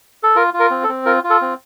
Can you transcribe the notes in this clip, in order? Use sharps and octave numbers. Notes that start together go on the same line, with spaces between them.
A4
F4 A#4
F4
A#4
C4
A4
C4
F4 A#4
F4
A4
C4